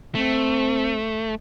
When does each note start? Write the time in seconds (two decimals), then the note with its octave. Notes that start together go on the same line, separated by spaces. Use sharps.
0.15 A3 C4